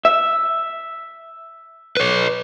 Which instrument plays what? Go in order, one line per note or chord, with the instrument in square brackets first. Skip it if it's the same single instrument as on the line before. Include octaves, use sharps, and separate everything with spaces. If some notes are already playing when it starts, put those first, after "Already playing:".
[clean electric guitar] E5
[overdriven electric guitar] B4 C#5